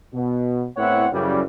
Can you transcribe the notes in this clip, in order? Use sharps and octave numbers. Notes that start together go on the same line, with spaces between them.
B2
A2 B3 C4 E4 C#5 F#5
F#2 C#3 E3 G3